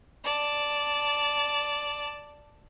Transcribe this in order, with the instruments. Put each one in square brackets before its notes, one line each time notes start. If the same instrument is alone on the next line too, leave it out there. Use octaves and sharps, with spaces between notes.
[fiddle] D5 A5